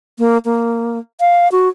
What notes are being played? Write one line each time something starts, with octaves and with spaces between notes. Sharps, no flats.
A#3
A#3
F5
F#4